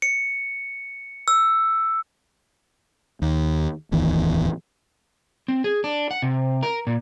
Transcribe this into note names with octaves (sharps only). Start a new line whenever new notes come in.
C#7
E6
D#2
D1 A1 E2 D#3
C4
G#4
D4
F#5
C3
A#4
A#2